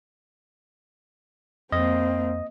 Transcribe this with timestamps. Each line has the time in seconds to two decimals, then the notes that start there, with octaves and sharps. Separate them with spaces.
1.72 F2 A#3 C4 D#5